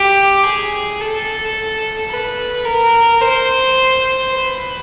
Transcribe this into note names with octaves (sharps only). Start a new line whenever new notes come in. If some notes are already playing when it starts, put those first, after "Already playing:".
Already playing: G4
G#4
A4
B4
A#4
C5
B4